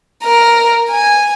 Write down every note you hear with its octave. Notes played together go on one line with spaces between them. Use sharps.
A#4
G#5